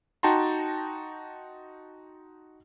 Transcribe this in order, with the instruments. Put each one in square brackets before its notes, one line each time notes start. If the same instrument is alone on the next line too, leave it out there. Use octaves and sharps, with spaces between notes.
[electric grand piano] D#4 F#4 G5 A5 A#5 C6